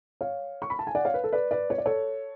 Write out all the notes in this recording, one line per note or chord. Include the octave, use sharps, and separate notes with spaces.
C#5 F5
C#6
B5
A5
G#5
D5 F#5
C#5 F5
B4
A4
B4 D5
B4 D5
C#5
D5
A4 C#5